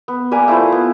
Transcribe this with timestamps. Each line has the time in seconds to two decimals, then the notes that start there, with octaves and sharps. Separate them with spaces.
0.08 B3
0.31 G3 A#3 B4 G#5
0.48 A3 E4 F4 C5
0.72 B3